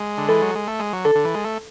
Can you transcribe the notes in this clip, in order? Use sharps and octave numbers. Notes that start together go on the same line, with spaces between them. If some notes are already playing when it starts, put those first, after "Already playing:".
Already playing: G#3
D3
E3 A4
F#3
G#3
A3
G#3
F#3
D3 A4
D3
E3
G#3
A3